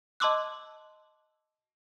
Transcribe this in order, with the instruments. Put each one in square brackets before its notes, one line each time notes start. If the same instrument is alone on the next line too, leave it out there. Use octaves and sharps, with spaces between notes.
[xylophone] D#5 A5 C6 D6 E6 F#6